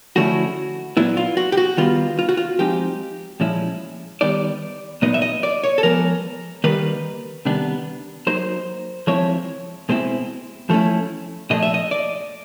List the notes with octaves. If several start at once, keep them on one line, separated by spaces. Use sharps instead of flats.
D3 F3 A3 C#4 E4 F#4
A#2 F#3 B3 E4
F4
F#4
G4
F#4
D#3 G3 B3 F4
F4
F#4
F4
F3 G#3 C4 D#4 G4
A#2 F3 G#3 C#4 E4
D#3 G3 B3 D#4 D5
A#2 F#3 B3 D#4 D#5
E5
D#5
D5
C#5
A4
F3 G#3 B3 A#4
D#3 G3 A#3 B4
C3 D#3 G3 B3 D4
F#3 A#3 D#4 C5
F3 G#3 C4 E4 C#5
B2 G#3 C4 E4
F3 A3 C#4 E4
A#2 F3 A3 D4 D#5
E5
D#5
D5